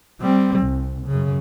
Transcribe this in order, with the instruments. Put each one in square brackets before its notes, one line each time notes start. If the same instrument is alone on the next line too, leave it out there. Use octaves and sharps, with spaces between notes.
[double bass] G3 C4
C2
F#2 C#3